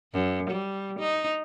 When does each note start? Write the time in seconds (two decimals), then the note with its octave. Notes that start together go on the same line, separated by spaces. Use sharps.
0.13 F#2
0.50 G3
0.99 D#4